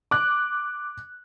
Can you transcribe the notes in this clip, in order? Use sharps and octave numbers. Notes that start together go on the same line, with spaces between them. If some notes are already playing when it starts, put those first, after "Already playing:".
D6 F#6